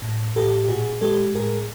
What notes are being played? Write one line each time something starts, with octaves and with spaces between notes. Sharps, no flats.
A2
A2 G4 A4
G4
A#2 F#4 G#4
G#3 G4 A4
A2 G#4 A#4